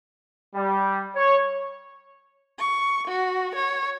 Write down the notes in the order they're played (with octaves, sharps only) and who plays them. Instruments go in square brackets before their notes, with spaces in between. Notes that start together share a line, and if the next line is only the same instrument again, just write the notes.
[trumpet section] G3
C#5
[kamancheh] C#6
F#4
C#5